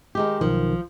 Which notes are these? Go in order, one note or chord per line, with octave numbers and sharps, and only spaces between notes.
D#3 G#3 G4
B1 D#3 F3